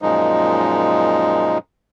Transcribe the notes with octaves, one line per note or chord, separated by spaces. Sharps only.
F#2 A#2 F3 G#3 D#4